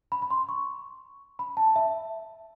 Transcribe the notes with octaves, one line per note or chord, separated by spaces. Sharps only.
B5
B5
C6
C#6
B5
A5
E5